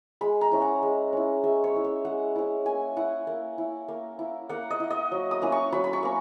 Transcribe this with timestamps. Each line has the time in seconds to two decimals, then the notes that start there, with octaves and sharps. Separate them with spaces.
0.21 G#3 B5
0.41 A#5
0.52 C#4 E4
0.62 F#5
0.82 G#3
1.13 C#4 E4
1.44 G#3 E5
1.64 C#5
1.74 C#4 E4
1.84 E5
2.05 G#3 F#5
2.36 C#4 E4
2.65 A#3 G#5
2.97 E4 F#5
3.27 A#3
3.58 E4
3.88 A#3
4.19 E4
4.49 A#3 F#5
4.70 D#5
4.80 E4
4.90 D#5
5.12 F#3
5.31 D#6
5.42 A#3 C#4 E4
5.52 C#6
5.72 F#3 B5
5.84 B5
5.93 C#6
6.03 A#3 C#4